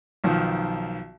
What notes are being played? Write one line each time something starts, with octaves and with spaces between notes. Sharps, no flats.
B1 D#3 F3